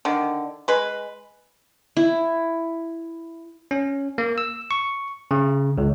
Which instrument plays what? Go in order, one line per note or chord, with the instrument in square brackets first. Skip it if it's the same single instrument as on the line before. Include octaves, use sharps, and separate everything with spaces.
[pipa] D3 D#3
G#3 B4
[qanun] E4
[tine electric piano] C#4
A#3
E6
C#6
C#3
C#2